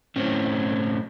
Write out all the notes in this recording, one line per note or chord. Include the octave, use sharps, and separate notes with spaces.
A2 C4 C#4